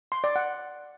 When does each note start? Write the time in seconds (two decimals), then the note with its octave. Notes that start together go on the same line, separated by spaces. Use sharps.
0.12 C6
0.24 D5
0.36 F#5